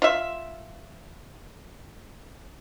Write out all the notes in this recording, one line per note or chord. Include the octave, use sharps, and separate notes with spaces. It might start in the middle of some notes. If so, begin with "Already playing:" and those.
F4 E5